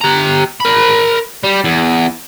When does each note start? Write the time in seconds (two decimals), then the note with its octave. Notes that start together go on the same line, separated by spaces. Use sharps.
0.01 G4 A#5
0.60 A#4 B5
1.44 G3
1.64 E2